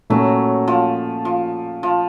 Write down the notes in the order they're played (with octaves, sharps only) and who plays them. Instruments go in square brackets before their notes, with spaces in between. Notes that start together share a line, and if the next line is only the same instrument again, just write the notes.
[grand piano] A#2 A3 C#4 [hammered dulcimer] F#3
[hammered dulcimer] F3
F3
F3